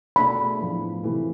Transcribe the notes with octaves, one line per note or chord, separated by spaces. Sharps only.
B2 A3 D4 G#4 B5
A2 F3 B3
C3 E3 A3 E4